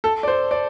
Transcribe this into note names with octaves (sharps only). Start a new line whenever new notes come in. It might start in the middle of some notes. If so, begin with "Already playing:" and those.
A4
D5
C5
D5